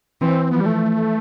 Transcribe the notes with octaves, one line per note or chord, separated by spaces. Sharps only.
E3 C4
F3 B3
G3
A3